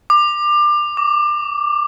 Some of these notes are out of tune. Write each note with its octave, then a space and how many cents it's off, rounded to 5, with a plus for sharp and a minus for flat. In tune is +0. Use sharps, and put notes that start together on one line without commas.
D6 +25
D6 -25